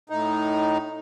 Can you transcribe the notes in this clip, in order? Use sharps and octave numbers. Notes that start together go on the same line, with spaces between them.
A2 D#4